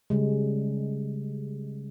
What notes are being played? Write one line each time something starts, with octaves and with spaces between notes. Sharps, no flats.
C#3 G3 G#3